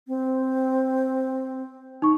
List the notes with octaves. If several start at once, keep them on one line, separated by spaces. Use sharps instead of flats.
C4
D#4 C#6